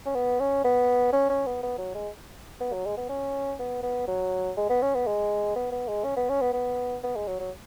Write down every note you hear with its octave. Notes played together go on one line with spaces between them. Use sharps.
C#4
B3
C#4
B3
C#4
C#4
B3
B3
F#3
G#3
B3
F#3
G#3
B3
C#4
B3
B3
F#3
G#3
B3
C#4
B3
G#3
B3
B3
G#3
C#4
B3
C#4
B3
B3
B3
G#3
F#3
F#3